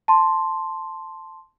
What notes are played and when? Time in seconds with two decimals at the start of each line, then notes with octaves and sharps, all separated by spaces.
0.08 A5 C6